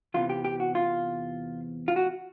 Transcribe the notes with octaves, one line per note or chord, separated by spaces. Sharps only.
E2 C3 E3 F4
G4
G4
F#4
F4
F4
F#4